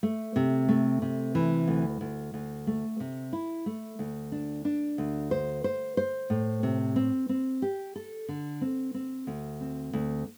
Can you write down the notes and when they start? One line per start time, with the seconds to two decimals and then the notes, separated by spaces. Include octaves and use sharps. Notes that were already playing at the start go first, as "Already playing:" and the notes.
0.03 A3
0.36 C3
0.69 A3
1.02 C3
1.35 E3
1.67 D2
2.01 D2
2.34 D2
2.67 A3
3.00 C3
3.33 E4
3.66 A3
3.99 D2
4.32 D4
4.65 D4
4.98 D2
5.31 C5
5.64 C5
5.97 C5
6.30 A2
6.63 C3
6.96 C4
7.29 C4
7.62 G4
7.96 A4
8.29 D3
8.61 C4
8.94 C4
9.27 D2
9.61 C4
9.93 D2